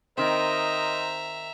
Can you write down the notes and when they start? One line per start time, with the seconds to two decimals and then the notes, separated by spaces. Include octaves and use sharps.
0.18 D#3 C4 A#4 C5 D#5 E5 A#5